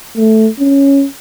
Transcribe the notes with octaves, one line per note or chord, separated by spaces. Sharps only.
A3
C#4